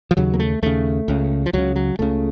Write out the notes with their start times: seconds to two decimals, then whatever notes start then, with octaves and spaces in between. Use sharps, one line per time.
0.11 F3
0.17 D#2 C#3 F#3
0.34 A#3
0.39 A3
0.62 D#2 C#3 A3
1.08 C#2 C#3
1.46 F3
1.53 C#2 C#3 F#3
1.76 F#3
1.99 C#2 C#3 A3